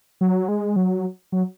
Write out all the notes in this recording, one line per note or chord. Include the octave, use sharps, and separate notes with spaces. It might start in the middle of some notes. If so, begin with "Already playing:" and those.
F#3
G#3
F#3
F#3